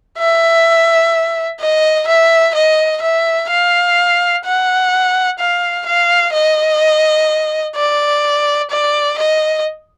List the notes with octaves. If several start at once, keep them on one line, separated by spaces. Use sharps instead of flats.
E5
D#5
E5
D#5
E5
F5
F#5
F5
F5
D#5
D5
D5
D#5